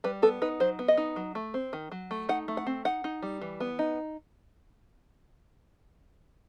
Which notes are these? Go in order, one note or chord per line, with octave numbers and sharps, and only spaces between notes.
G3 B4
B3 A4
D#4 B4
F#3 C5
B3
D#5
D#4
F#3
A3
C4
D#3
F#3
A3
D#4 F#5
A3
F#5
C4
D#4 F#5
D#4
G3
E3
B3
D#4